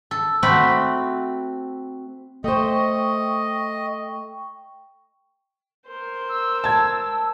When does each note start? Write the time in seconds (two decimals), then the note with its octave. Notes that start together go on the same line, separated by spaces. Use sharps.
0.11 A4
0.43 A3 C4 F#4 G5 B5
2.44 A3 C5 D#5 G5 C#6
5.87 A#4 C5
6.29 E6
6.64 A5 G#6